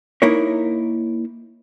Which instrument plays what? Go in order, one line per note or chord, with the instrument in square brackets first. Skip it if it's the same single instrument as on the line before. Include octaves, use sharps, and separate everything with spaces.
[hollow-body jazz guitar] A#3 D#4 E4 A#4 C#5